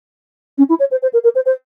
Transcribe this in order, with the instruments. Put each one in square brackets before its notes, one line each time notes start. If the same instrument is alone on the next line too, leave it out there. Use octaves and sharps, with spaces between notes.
[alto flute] C#4
E4
C#5
C5
C5
A#4
A#4
C5
C5